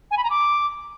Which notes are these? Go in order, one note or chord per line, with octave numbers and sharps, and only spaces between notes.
G#5
B5
A#5
D6